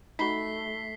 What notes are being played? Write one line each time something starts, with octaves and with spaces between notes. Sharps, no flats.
A3 D#4 F#4 B5 B6 C7 G7